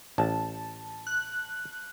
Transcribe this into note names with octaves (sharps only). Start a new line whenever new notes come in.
A1 A5
F#6